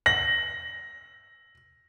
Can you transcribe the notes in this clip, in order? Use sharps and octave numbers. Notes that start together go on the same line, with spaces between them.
A#6 F#7